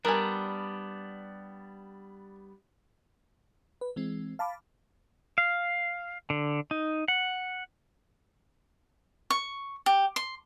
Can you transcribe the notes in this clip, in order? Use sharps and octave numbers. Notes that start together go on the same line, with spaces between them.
G3 B3 D4 A#4 G#5
B4
E3 G#3 C4
F5 A5 B5 D6
F5
D3
D#4
F#5
C#6
G4
C6